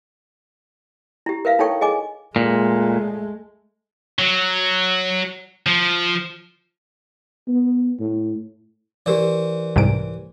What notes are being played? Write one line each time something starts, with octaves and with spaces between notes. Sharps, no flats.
E4 G4
A#4 B4 E5 F5
D#4 E4 A4 C#5 G5 C#6
G#4 D#5 G#5 D6
A#2 G#3 A3
F#3
F3
B3
A2
E3 G4 A#4 C5 D5
C2 G#2 D7